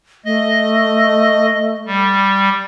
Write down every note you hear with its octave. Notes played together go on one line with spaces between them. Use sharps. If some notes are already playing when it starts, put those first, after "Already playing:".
A3 D#5
G3